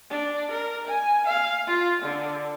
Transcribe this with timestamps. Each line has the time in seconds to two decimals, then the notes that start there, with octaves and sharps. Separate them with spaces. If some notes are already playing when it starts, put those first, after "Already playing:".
0.10 D4
0.52 A#4
0.88 G#5
1.27 F5
1.67 F4
2.03 D3